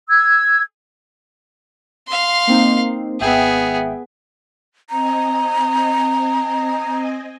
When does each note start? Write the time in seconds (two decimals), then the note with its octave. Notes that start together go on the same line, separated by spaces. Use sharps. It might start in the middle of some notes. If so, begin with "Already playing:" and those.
0.09 E6 G#6
2.08 F5 C6
2.47 A#3 C4 D#4
3.20 G#1 B3 G#4 E5 G5
4.90 C4 D#5 G#5 A#5